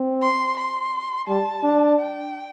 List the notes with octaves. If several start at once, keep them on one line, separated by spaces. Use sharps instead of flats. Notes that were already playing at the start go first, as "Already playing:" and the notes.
Already playing: C4
C6
C6
G3 A5
D4
G5